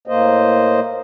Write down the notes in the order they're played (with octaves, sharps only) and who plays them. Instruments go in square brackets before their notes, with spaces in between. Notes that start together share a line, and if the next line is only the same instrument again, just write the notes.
[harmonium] A2 A#3 C5 D#5